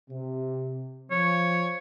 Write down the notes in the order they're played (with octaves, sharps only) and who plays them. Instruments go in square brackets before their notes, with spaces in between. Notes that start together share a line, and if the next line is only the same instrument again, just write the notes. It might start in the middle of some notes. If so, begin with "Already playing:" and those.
[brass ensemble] C3
[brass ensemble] F3 [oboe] C#5